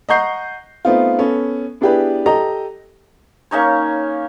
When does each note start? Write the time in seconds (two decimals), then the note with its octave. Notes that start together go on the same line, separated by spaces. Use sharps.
0.09 D#5 F#5 A#5 C#6 G6 C7
0.85 A3 B3 C4 D#4 F4
1.18 B3 C#4 A4
1.81 B3 D4 E4 G4 G#4 B4
2.26 G4 A4 D#5 A#5
3.51 A#3 C#4 D#4 C#5